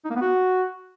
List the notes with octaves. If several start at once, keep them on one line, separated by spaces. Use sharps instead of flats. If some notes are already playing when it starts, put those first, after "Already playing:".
D#4
A#3
B3
F#4